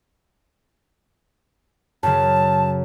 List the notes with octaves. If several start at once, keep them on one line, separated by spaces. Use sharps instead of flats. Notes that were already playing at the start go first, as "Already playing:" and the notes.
F#2 C#3 A5